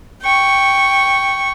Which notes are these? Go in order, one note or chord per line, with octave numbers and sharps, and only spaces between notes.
G5 C#6